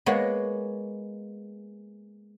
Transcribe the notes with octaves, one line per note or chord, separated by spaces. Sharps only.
G#3 A#3 B3 C#5